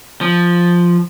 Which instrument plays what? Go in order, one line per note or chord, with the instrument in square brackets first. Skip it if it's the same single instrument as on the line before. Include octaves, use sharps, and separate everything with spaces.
[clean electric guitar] F3